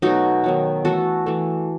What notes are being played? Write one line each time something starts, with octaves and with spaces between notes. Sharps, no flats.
B2 F#3 A3 D#4 F#4
D#3 F#3 B3
E3 A3 F#4 A4
E3 A3